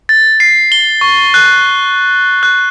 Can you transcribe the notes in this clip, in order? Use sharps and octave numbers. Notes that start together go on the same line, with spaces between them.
A6
C7
G7
C#6
F#6
F#6